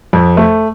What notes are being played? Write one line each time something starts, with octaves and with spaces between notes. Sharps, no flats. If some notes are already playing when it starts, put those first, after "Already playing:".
F2
A3